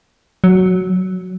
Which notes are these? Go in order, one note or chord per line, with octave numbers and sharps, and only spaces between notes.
F#3